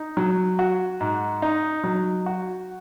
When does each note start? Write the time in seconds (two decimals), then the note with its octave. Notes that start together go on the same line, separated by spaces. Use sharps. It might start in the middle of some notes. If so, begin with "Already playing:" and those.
Already playing: D#4
0.17 F#3
0.59 F#4
1.01 G#2
1.42 D#4
1.84 F#3
2.26 F#4